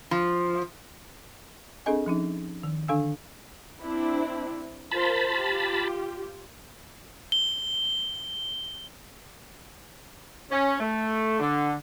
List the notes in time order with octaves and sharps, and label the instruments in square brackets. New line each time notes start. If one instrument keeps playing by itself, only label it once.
[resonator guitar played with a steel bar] F3
[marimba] C4 D4 G#4 A4 D#5 G#5
F3 C#4 D#4
D#3
D3 D4 A4 F5 G#5 E6
[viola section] C4 D4 E4
[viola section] F4 A#4 C5 [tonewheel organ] A5 B5
[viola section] F4 G4
[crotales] G7
[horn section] C#4
A3
D3